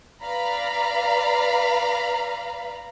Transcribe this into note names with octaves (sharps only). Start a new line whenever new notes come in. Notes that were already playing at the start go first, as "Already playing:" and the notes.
B4 D5 F5 A#5 B5